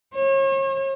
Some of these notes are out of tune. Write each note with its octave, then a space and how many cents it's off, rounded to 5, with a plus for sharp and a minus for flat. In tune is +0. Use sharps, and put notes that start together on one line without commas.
C#5 -40